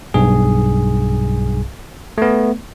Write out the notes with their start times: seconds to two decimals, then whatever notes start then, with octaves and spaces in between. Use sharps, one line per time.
0.14 B1 G2 G#4
2.18 A3 B3